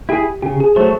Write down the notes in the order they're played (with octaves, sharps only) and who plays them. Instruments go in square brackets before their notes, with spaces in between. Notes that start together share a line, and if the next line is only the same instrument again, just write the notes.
[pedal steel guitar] E4 G#4 [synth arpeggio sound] G4
[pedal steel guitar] C#3 [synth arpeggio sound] G4
[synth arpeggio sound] G#4
[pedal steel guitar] F#3 A3 [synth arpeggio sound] C5